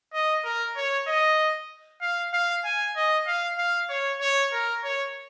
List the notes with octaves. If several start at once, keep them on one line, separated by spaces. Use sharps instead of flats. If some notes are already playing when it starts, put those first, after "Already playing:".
D#5
A#4
C#5
D#5
F5
F5
G#5
D#5
F5
F5
C#5
C#5
A#4
C#5